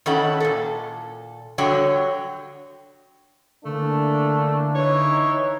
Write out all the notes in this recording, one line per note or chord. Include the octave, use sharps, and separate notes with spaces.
D#3 C#4 E4 A4 F#5
A#2 A4
D3 F#3 G3 C#5 G5
D3 E3 A3 A#3 D4
E3 D#4 C#5